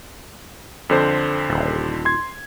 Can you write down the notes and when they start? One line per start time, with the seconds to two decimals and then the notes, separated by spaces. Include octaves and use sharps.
0.89 F2 D3 C5
1.50 D#1
2.05 C6 G#6